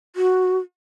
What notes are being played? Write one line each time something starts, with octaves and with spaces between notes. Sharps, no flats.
F#4